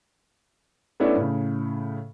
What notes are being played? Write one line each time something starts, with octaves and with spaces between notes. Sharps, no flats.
A3 B3 C#4 D4 E4
A2 C#3